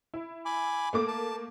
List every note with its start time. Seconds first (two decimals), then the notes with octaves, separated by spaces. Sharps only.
0.14 E4
0.46 G#5 B5 D6
0.93 A3 A#3 D6
1.08 A5